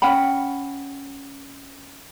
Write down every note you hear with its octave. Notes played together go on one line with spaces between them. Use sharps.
C#4 F#5 G5 B5